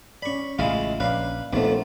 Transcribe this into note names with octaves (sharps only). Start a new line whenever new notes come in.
C#4 D5 B5 C#6
A1 C#3 G#3 E4 F4
A#1 C#4 B4 D5 F5
A#1 D#2 F3 A3 B3 C4 D#4